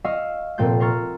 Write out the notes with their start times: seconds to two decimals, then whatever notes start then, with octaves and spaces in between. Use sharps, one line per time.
0.04 D#5 F5 C#6 E6
0.58 F1 A#2 C4 A4 C6 G6
0.80 A#5 C6 C#6 E6 F6 A6